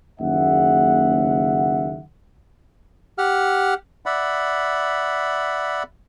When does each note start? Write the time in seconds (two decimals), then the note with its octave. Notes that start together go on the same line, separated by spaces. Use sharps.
0.20 F#1 D#2 C#3 E5 F#5
3.18 G4 F#5 F6
4.06 D5 E5 F#5 B5